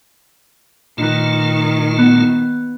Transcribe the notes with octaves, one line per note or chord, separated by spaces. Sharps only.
A#2 D#3 A3 D#4 F4 B4
B3